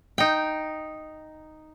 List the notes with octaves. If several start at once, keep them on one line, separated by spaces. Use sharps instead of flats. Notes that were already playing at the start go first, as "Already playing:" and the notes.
D#4 G5